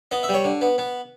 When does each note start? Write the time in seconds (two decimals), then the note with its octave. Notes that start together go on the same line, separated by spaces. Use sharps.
0.11 B3 D#5
0.23 E5
0.29 G3
0.34 C#5
0.44 D3
0.61 B3
0.78 B3